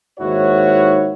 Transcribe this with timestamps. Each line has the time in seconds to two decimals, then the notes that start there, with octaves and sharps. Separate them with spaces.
0.19 D#2 G#2 E4 F#4 C#5